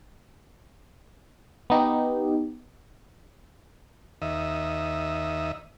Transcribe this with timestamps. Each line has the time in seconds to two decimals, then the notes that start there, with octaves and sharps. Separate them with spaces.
1.70 B3 D#4 G4
4.22 D#2 D#5 E5